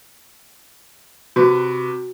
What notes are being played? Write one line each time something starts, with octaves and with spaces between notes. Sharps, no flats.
C3 F#4 B4 C#6